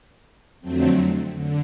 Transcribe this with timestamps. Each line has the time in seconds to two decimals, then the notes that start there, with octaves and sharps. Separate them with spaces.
0.61 F2 D3 F#3 A3 C4
1.33 D3